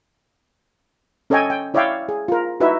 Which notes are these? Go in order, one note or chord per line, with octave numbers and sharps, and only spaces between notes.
C#4 A4 C#5 D#5 G5 G#5
G5
E4 C#5 D5 E5 F5 G5
G#4
F4 A#4
D#4 E4 F#4 B4 E5